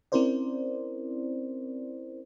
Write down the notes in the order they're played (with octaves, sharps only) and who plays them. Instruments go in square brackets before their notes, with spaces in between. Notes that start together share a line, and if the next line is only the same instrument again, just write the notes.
[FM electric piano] C4 C#4 E4 A#4 C5 D5